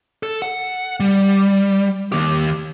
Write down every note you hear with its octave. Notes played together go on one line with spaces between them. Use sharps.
A4
F#5
G3
D#2 G4